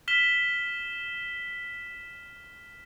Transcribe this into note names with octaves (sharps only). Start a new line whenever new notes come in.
F6 B6 E7 G7